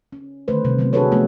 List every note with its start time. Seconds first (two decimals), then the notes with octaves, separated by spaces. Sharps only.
0.13 C#4
0.48 D3 D#3 A3 B4 C5
0.65 C3 G3
0.79 F#3 G#3 A3 B3
0.93 D4 F#4 G#4 A4 B4 C#5
1.11 F3 A3 B3 C4 G4